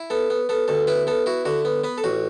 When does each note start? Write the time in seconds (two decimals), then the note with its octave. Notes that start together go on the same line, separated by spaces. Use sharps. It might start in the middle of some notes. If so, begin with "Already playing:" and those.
Already playing: E4
0.10 B3 A4
0.30 B3
0.49 B3 A4
0.68 D2 A4
0.87 B3 E4 B4
1.07 B3 A4
1.26 E4 F#4
1.45 D3 F#4
1.65 B3
1.84 B3 B4
1.98 A4
2.04 A1 F#4